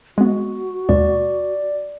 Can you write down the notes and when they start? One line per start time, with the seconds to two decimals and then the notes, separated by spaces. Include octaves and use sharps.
0.18 G#3 B3 F#4
0.89 D#2 B2 G#3 D5